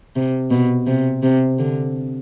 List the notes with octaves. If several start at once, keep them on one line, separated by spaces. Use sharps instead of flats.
C3
B2
C3
C3
D3